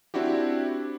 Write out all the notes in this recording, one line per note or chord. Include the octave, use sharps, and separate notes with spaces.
C4 D4 E4 F#4 G4